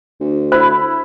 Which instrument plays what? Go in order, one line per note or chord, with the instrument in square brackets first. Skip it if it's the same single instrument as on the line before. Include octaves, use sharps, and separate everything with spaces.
[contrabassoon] D2
[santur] E4 B5 [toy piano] C5